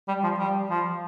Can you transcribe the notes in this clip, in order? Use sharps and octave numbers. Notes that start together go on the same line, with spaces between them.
G3
F3
G3
F3